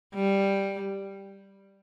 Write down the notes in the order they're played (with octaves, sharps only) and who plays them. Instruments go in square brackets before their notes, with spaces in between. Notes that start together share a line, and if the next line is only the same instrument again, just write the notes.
[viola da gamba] G3